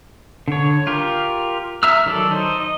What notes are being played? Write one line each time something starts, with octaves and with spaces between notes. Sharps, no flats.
D3 C#5
F4 G4 A#4
E5 A#5 E6 F6
D#3 F#3 A4 D5
D#4 C5
D#5